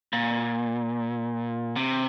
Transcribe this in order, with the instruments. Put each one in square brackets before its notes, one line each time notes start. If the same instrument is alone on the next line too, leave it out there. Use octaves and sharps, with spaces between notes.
[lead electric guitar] A#2
C3